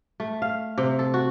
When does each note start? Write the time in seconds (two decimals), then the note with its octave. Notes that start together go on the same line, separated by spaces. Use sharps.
0.20 A3
0.42 F5
0.78 C3
0.99 A4
1.14 F#4